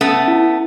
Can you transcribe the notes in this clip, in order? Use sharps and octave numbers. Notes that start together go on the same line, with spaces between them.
A3 B3 C#4
E4